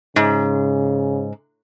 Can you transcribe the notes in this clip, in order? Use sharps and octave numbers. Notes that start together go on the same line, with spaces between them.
G#2 C#3